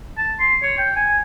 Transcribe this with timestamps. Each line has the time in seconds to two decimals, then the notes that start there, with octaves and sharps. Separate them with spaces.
0.17 A5
0.39 C6
0.62 C#5
0.78 G5
0.96 G#5